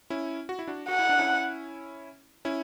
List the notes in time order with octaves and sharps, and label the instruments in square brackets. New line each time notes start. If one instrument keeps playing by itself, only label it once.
[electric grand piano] C#4 E4
F#4
E4
D4 F#4
[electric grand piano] F#4 [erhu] F#5
[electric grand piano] E4
D4
C#4 E4
C#4 E4